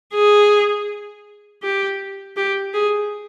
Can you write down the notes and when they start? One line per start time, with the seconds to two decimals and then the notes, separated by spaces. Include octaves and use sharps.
0.14 G#4
1.63 G4
2.37 G4
2.74 G#4